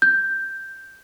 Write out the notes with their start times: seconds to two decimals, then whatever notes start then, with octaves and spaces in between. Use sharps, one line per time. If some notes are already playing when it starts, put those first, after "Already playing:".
0.02 G6